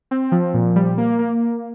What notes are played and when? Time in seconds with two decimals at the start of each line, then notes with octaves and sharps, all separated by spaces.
0.11 C4
0.32 F3
0.54 A#2
0.76 G3
0.98 A#3
1.19 A#3